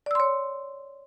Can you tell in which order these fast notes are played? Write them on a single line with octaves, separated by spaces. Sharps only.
D5 E6 C6 C#5